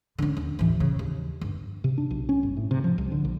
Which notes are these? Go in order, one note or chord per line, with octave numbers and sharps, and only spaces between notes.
D3 C#4
D#2
A1 E3
C#3
D#2
G1
C3
D4
B1
C#4
G1
A2
C3
F3
C2
D3
A#1